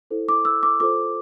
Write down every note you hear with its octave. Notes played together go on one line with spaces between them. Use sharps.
E4 A4 C5
D6
E6
D6
F4 A4 C5 D6